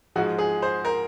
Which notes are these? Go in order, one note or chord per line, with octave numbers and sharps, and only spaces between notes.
G#2 F3 G#3 F#4
G#4
C5
A#4